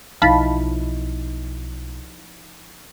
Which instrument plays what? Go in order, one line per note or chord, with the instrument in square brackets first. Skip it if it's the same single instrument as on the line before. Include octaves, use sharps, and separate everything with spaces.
[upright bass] B1 [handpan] F3 D#4 E4 [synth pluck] F5 A5 B5